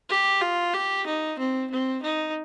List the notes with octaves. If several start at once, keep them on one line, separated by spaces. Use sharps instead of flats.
G4
F4
G4
D#4
C4
C4
D#4